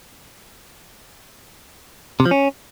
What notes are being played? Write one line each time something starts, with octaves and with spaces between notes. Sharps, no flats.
C3
F3
C#4